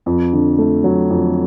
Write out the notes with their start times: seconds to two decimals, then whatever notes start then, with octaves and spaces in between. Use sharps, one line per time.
0.06 F2
0.33 D3
0.58 A3
0.84 F#3
1.10 F2